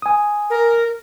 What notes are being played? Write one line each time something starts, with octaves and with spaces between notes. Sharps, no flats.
G#5 D#6
A#4